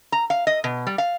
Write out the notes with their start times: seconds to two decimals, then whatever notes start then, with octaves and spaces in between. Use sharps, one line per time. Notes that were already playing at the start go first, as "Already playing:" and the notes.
0.12 A#5
0.30 F5
0.47 D#5
0.64 B2
0.87 G3
0.98 F5